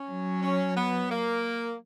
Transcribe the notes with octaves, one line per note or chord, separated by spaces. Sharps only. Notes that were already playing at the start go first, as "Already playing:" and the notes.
Already playing: C#4
F#3
C#4
B3
A#3